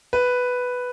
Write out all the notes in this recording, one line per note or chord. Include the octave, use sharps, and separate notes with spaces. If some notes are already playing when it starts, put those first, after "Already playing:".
B4